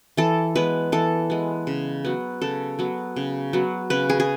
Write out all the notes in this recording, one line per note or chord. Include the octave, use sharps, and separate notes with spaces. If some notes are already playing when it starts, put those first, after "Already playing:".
E3 A4
G#3 B3 B4
E3 A4
G#3 B3
C#3
F#3 B3
C#3 A4
F#3 B3
C#3
F#3 B3
C#3 B4
G#4
G#4